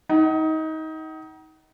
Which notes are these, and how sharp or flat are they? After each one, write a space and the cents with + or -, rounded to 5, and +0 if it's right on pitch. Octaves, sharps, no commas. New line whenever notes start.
D#4 +25 F#5 +45